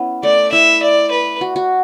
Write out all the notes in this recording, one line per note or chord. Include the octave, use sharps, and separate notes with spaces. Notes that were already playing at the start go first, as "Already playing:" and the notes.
Already playing: B3 C#4 E4
A3 D5
E4 E5
D5
B4
F#4
F#4